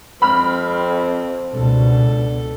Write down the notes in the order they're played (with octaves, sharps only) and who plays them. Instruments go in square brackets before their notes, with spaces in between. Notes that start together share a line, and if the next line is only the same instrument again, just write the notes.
[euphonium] F2 [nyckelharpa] C4 [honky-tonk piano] B5 F6
[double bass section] C#2 B2 [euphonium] D4 [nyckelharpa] A4